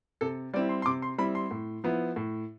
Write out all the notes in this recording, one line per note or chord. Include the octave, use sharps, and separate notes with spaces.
C3 A4
G3 C4 E4 D5
C6
C6
C3 D6
C6
G3 C4 E4 B5
C6
A2
F3 B3 E4
A2